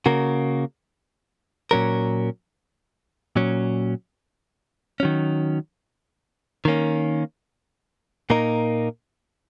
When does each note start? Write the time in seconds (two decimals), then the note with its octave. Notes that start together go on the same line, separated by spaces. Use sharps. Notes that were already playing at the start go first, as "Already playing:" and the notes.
0.06 C#3 A#3 F#4 A#4
1.71 A#2 F#3 C#4 A#4
3.36 A#2 F#3 C#4
5.00 D#3 F#3 C#4
6.65 D#3 A#3 C#4
8.30 A#2 A#3 D#4 A#4